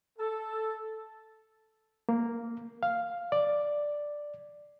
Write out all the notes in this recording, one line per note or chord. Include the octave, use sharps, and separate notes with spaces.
A4
A#3
F5
D5